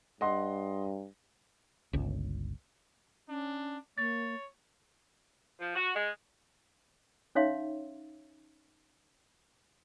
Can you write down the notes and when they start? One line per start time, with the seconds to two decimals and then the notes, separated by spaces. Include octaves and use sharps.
0.21 G2 D#5 F#5 C6
1.93 G1 C#2
3.29 C#4 D4
3.98 A#3 C#5 A6
5.59 F3
5.76 F#4
5.94 G#3
7.35 C#4 D#4 C#5 E5 F5 C6